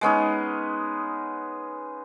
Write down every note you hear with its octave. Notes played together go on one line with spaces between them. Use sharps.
G#3 B3 C#4 D#4